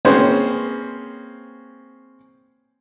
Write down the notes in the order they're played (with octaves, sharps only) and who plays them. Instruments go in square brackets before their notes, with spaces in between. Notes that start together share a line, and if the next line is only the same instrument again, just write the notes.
[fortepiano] A#3 C4 C#4 G#4 B4 C5